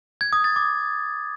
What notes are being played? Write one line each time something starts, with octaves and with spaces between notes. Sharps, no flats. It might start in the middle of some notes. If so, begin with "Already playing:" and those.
G#6
D#6
A6
D6